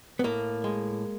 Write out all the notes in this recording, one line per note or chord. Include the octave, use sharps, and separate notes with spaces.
B3
A2 A#3
G#3